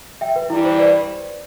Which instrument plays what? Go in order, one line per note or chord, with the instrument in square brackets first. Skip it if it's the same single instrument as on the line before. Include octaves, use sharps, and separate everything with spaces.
[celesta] E5 G5
B4
[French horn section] G2 E3 G3 [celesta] E4
[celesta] C5
B4 D5